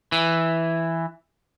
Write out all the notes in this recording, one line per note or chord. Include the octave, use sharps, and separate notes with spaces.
E3